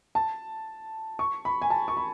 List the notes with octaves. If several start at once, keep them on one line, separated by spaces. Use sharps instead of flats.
A5
C#6
B5
G#5
A5
C#6
B5